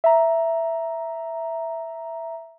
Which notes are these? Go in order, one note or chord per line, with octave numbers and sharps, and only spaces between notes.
E5 A#5